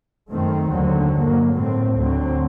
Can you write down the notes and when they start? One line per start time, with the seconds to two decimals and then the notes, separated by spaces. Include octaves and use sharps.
0.31 F#2 D#3 A3 C4
0.72 D#2 D3 F#3
1.13 G2 F#3 A#3
1.55 A2 A3 C4
1.97 D2 D3 F#3 C4